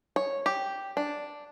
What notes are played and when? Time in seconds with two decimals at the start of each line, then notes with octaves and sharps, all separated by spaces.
0.16 C#5
0.46 G4
0.97 D4